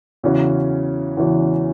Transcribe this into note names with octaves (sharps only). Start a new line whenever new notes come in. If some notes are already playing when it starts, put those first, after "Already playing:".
E2 C#3 E3 C#4 F#4
E2 C#3 E3 C#4 F#4